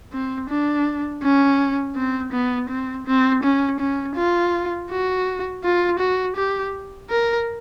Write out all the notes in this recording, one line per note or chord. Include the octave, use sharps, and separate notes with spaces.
C4
D4
C#4
C4
B3
C4
C4
C#4
C#4
F4
F#4
F4
F#4
G4
A#4